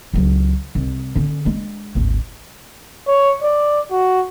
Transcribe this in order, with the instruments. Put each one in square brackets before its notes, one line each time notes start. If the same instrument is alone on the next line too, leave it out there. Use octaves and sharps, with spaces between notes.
[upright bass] C#2 F#3
C2
D3 C#4
G#3 D4
G#1 D2
[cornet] C#5
D5
F#4